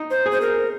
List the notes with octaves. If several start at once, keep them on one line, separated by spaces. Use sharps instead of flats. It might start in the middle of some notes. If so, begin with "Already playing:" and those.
Already playing: D#4
C5
G#4
C5
A#4